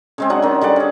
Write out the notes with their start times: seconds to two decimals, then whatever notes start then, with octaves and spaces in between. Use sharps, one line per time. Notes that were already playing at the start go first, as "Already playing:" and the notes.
0.18 C#3 G#3 C4
0.30 F#3 D4 D#5 F#5
0.42 D#3 F#3
0.61 D3 G3 D5 F#5
0.76 C#4 G#4